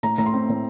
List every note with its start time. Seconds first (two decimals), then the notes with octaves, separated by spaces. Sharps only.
0.03 A2 A#5
0.18 A2 A#5
0.26 C6
0.34 C4
0.49 A2